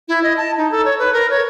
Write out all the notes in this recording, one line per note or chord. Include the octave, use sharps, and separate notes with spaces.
E4
D#5
A5
D#4
A4
C#5
B4
A#4
C#5